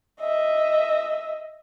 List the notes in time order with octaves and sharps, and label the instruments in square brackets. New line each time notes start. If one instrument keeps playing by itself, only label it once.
[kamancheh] D#5 E5